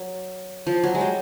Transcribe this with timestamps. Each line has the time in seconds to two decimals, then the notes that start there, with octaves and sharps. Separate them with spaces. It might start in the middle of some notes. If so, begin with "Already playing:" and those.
Already playing: F#3
0.67 F3
0.84 F#3
0.95 G#3
1.01 G3